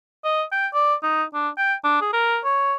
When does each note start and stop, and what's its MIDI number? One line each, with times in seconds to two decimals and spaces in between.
0.24 0.43 75
0.52 0.67 79
0.74 0.94 74
1.03 1.23 63
1.34 1.49 62
1.58 1.74 79
1.84 2.01 62
2.01 2.11 68
2.13 2.39 70
2.44 2.76 73